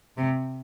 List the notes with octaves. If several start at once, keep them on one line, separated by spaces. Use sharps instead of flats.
C3